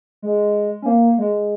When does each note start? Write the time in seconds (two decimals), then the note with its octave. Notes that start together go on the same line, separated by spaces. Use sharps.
0.22 G#3
0.82 C#4
0.86 A#3
1.18 G#3